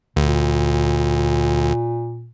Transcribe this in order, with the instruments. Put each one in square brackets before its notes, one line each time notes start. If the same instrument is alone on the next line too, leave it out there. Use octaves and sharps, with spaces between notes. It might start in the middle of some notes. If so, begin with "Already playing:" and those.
[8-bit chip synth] D2 [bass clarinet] A#2